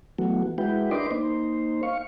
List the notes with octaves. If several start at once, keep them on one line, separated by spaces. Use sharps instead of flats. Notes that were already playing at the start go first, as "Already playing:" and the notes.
E3 F#3 A3 B3 F#4
G#3 E4 F#4 B4 G5
D4 A#4 B4 D#5 C6 D6
A#3 D#4 C5
F5 C#6